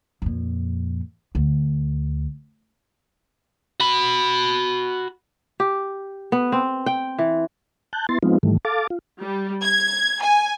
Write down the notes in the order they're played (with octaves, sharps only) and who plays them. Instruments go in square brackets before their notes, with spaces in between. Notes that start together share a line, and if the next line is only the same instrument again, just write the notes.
[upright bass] F2 A#2
D2
[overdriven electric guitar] F#4 B5
[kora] G4
B3
C4
G5
E3
[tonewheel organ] A5 F#6 G6
B3 E4 C6 A6
F3 G#3 B3 C4 D#4 F4
G#2 D#3 E3 G3 A3
A4 F5 D6 A6
F4
[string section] G3
G#6
G#5